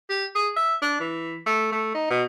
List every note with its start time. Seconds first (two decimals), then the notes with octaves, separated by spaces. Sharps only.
0.10 G4
0.35 G#4
0.56 E5
0.82 D4
1.00 E3
1.46 A3
1.72 A3
1.94 D#4
2.10 B2